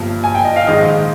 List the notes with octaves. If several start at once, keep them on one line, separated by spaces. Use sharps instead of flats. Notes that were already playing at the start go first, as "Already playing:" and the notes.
Already playing: G1 G2 F3 A#3
G#5
G5
D#5
F5
A#1 G#2 D#3 G#3 D#5